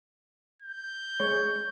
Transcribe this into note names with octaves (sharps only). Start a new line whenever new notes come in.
G6
G#3 C#5